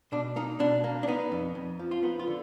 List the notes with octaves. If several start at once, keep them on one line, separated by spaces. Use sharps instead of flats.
B2 D4
A#3 D#4
B2 D4
A#3
D4
B3 D#4
F2
F2
F3
F4
B3 D#4
F4
D3